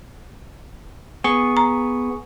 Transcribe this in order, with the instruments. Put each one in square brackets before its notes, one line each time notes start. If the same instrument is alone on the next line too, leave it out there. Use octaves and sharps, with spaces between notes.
[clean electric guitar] B3 [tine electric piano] G#4 C#6
[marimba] A#5